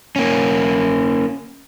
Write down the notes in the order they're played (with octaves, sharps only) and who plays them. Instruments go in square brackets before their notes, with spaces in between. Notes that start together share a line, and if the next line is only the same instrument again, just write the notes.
[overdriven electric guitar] A#3 C#4